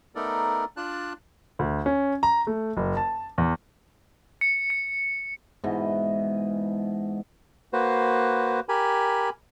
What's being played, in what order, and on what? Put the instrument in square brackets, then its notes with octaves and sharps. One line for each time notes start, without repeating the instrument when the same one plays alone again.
[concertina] A3 B3 D#4 A4 A#4 D5
D4 F4 D5 A5 F#6
[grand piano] D2
C#4
A#5
A3
F#1
A5
E2
[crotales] C#7
C#7
[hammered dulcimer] G#2 B2 E3 D#5
[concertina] A#3 F#4 B4 C5
G4 A#4 G#5 B5